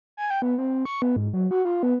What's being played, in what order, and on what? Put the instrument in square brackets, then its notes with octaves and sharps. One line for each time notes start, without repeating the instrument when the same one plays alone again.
[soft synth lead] G#5
G5
B3
C4
C#6
B3
G#2
F#3
F#4
F4
B3